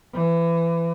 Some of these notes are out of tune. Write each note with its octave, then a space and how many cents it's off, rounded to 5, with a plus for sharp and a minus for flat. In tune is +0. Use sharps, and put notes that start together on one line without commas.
E3 +25